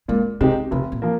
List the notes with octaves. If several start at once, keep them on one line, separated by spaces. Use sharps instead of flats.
A#2 G#3
C3 G#3 C4 D#4 G4
F1 C3
A#2
F3 A#3